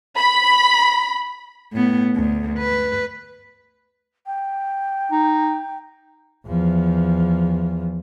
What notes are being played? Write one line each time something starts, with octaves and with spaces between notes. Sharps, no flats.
B5
A2 B3
D2
B4
G5
D#4
E2 F3